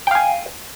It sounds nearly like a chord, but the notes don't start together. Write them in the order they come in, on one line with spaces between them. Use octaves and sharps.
G5 F5 G#5